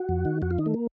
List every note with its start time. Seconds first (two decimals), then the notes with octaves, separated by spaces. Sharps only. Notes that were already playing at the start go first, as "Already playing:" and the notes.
Already playing: F#4
0.09 F2
0.25 D#3
0.42 F2 F#4
0.51 F4
0.58 D#3 D#4
0.66 A3
0.74 A#3